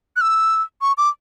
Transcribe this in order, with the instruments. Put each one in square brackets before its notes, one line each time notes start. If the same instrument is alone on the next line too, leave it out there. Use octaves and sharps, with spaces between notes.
[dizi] F#6
E6
C#6
D6